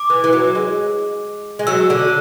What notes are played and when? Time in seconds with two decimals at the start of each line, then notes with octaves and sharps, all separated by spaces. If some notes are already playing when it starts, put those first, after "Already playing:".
Already playing: D6
0.10 E3
0.24 E3
0.33 F#3
0.55 G#3
1.59 G#3
1.67 F#3 E6
1.90 D3